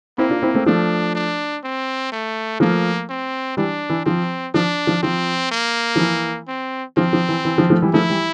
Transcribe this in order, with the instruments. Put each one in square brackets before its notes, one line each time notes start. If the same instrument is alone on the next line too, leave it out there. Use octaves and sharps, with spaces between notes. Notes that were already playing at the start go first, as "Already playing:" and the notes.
[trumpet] A#3 [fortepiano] C4 E4
[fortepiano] D4 F4
C4 E4
A3 C4
[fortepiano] F3 A3 [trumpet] D4
[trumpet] D4
C4
A3
[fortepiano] F3 A3 [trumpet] A#3
[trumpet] C4
[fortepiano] E3 G3 [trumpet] D4
[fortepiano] E3
[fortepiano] F3 [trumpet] C4
[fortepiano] F3 [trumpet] D4
[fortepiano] F3
[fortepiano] F3 [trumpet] C4
[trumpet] A#3
[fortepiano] F3
E3
[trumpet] C4
[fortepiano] F3 [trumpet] C4
[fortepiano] F3
E3
E3
F3
F3 A3
E3 G3
[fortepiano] F3 A3 [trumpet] E4
[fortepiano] E3 G3